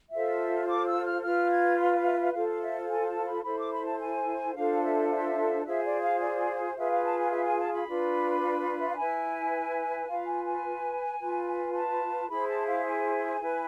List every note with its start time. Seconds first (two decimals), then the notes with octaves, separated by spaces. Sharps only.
0.12 F4 A4 C5 E5
0.68 D6
0.87 E6
1.05 F6
1.23 F4 B4 F6
1.50 G#6
1.78 C6
1.92 F5
2.06 E5
2.20 E5
2.33 F4 A4 C5 F5
2.48 F5
2.61 E5
2.89 G#5
3.08 A5
3.26 B5
3.44 E4 A4 C5 B5
3.58 D6
3.71 B5
3.86 A5
4.00 G#5
4.55 D4 F4 A4 C5 F5
4.83 E5
5.10 E5
5.65 F4 G#4 C5 E5
5.85 D5
6.02 F5
6.21 D5
6.76 F4 G#4 B4 E5
6.90 F5
7.04 A5
7.18 G#5
7.31 E5
7.45 G#5
7.59 A5
7.73 B5
7.87 D4 F4 B4
8.79 E5
8.88 F5
8.97 E4 B4 G#5
10.08 F4 B4 F5
10.26 G#5
10.45 G#5
11.19 F4 B4
11.74 A5
12.29 E4 G#4 C5 B5
12.48 A5
12.66 F5
12.86 G#5
13.40 E4 B4